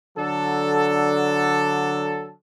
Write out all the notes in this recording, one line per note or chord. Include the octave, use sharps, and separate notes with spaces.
D3 F#3 D4 A4